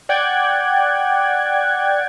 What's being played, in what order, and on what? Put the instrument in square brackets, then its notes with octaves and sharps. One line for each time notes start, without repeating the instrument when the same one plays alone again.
[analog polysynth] D5 F#5 G5 F#6 G#6